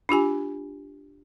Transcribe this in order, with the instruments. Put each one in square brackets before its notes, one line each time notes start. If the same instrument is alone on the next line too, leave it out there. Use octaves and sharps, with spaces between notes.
[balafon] D4 F4 G4 G#5